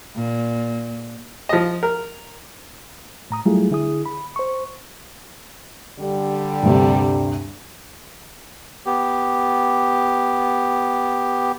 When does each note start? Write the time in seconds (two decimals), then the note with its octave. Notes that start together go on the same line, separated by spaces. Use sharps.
0.16 A#2
1.49 F3 D#5
1.83 A#4
3.30 A2 A#5 D#6
3.45 F#3 G3 A3 E4 F4 G#4
3.71 D3 E4 G#4 D#6
4.06 B5
4.36 C5 C#6
5.99 D3 G3
6.63 D2 G2 C3
8.86 B3 G4